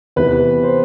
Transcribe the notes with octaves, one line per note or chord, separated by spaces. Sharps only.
E2 C3 E3 B4
C5